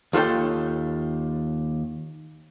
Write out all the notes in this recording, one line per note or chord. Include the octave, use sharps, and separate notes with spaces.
D#2 F4 A4 C#5 G5